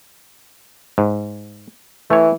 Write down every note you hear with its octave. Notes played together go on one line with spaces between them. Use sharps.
G#2
E3 A3 C#5